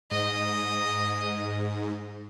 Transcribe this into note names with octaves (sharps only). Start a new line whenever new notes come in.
G#2 D#5